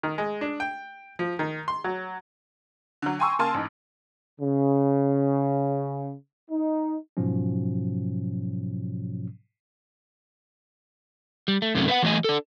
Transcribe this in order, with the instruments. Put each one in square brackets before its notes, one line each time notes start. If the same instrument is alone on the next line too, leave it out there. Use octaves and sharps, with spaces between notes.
[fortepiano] D#3
G#3
D4
G5
F3
D#3
C6
F#3
[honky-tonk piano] D3 F#3
G5 G#5 A#5 C6 C#6 E6
C#3 A#3 G#5 A5 C6 F6
A1 G#2
[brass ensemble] C#3
D#4
[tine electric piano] G#2 B2 F3 F#3 C#4
[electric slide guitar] G3
A3
F#2 C3 D#3 A3 C4 C#4
B4 E5 F#5
E3 F#3 A3 C5 D#5 G#5
D4 A4